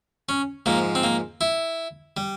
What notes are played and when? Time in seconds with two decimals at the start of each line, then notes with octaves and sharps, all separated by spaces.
0.29 C#4
0.66 G#2 F3 A#3
0.95 C4
1.03 A#3
1.41 E4
2.17 G3